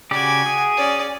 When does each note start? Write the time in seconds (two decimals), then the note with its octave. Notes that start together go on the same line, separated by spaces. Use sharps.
0.11 C#3 F#4 G4 D5 G#5
0.46 G#4
0.77 C#4 D5